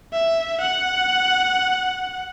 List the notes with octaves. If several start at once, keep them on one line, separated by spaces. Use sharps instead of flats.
E5
F#5